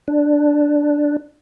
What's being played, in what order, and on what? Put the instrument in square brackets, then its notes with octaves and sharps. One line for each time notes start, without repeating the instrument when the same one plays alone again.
[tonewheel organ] D4